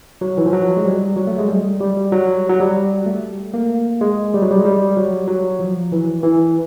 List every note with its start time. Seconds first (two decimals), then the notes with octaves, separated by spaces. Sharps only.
0.21 F#3
0.38 E3
0.46 F3
0.53 F#3
0.77 G#3
0.85 G3
1.17 F#3
1.27 A3
1.38 G#3
1.48 G3
1.80 G3
2.12 F#3
2.49 F#3
2.60 G3
3.06 A3
3.54 A#3
4.01 G#3
4.34 G3
4.42 F#3
4.51 G3
4.60 G#3
4.65 G3
4.97 F#3
5.28 F#3
5.59 F3
5.92 E3
6.23 E3